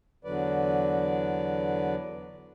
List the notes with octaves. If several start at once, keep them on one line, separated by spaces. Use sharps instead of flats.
E2 D3 F#3 B4 D5